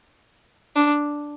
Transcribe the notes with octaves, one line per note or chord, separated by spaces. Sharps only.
D4